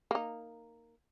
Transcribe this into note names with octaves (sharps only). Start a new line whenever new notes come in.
A#3 D#4